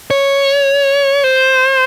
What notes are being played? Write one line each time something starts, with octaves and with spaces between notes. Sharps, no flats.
C#5
C5